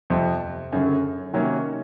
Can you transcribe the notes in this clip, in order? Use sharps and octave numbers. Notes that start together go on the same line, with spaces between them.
F2 C3 F3
G1 F#2 C#3 F#3
C3 D#3 F#3 A#3 C#4